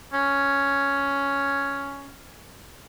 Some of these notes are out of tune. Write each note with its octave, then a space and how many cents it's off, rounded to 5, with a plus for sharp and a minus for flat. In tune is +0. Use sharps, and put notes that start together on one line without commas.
C#4 +5